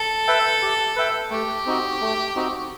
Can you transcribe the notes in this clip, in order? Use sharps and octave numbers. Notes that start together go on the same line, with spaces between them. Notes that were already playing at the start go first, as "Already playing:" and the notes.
Already playing: A4
B4 E5 G5
G4
B4 E5 G5
A3 G4
C4 D#4 F#4
A3
C4 D#4 F#4